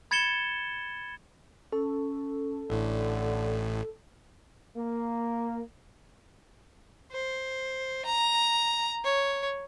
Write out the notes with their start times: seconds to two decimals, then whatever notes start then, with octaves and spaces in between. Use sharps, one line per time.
0.11 B5 G#6 A6 C#7 E7 G7
1.72 C#4 A4
2.70 A1 A2 D3 E4
4.76 A#3
7.12 C5
8.05 A#5
9.04 C#5